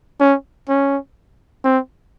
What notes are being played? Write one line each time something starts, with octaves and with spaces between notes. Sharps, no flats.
C#4
C#4
C4